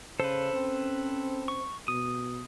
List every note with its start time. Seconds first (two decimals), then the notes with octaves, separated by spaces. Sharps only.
0.20 C#3 A4 B4 C5
0.53 C4 C#4
1.48 C#6
1.88 B2 D#6